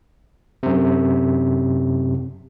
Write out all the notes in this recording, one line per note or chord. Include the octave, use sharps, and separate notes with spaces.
F#2 C3